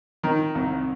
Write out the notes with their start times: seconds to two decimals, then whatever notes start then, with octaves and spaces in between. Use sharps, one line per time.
0.23 D#3
0.55 C2